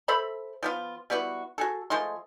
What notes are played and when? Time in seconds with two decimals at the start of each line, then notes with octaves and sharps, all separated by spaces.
0.08 A4 C5 E5 B5
0.63 F3 B3 F4
1.10 G3 B3 E4 F#4
1.58 F#4 G#4 A4
1.90 F3 G#3 A3 C6